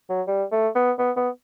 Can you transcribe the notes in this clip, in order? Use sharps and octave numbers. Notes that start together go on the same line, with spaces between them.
F#3
G3
A3
B3
B3
B3